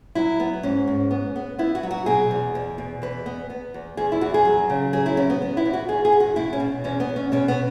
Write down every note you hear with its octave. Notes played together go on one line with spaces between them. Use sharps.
F#3 E4
B3
G#2 C#4
G#2
B3
B3
B3 E4
F#4
F#3
F#4
B2 G#4
E2
E2
B2
E2 B4
B3
B3
E2
E2 G#4
E4
E2 F#4
G#4
F#3
C#3
F#3 G#4
E4
B3 C#4
B3
B3
E4
E2
F#4
E2 G#4
G#4
E2
F#4
B2 E4
C#4
B2
E2 C#4
B3
E2
C#4
B2 C#4
B3